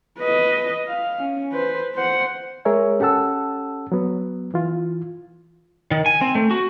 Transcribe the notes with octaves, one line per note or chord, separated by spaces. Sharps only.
B4 D#5
F5
C#4
B4 C5
C5 F#5
G#3 G#4 A#4 C#5 E5 G#5
C#4 G4 A4 F#5 A5 E6
F#3 B3
E3 F4
D#3
G#5
C4
A3
F#4